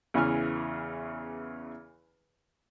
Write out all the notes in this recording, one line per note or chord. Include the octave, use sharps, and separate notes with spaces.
E2 C#3 E3 G#5 F6